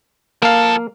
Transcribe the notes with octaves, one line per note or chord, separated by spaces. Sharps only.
F3 A#3 A4 F5